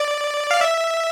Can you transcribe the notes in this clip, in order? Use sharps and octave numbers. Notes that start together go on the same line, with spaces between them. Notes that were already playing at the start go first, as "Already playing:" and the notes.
Already playing: D5
F5
E5